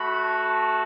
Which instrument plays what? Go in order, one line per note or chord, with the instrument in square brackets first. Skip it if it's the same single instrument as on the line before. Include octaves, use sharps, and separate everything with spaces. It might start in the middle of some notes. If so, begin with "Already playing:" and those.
Already playing: [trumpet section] A3 F#4 B5